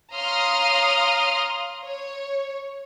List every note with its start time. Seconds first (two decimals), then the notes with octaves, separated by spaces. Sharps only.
0.13 C#5 F5 A#5 C6 D#6 F6
1.84 C#5